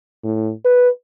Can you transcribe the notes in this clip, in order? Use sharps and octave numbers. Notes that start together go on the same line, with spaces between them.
A2
B4